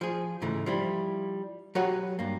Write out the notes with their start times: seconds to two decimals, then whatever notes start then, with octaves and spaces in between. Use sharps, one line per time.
0.01 F3 G#4
0.42 G#2 C#3 E3 A3
0.66 F3 G3 E4
1.75 F#3 F#4 G4 B4 C#5 F#5
2.19 G2 A#3